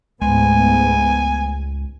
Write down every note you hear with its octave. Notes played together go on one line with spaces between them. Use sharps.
C#2 G#2 G#3 A3 B3 G#5